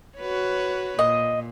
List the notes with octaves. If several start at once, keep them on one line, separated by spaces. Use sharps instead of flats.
F#4 B4 C#5
A#2 D#5